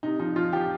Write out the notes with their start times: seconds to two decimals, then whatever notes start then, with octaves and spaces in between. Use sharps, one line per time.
0.03 C3 D#4
0.20 F3 D#4
0.36 F3 F4
0.53 F3 G4